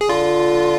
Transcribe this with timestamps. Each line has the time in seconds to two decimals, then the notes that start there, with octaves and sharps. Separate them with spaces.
0.01 G#4
0.09 D3 F4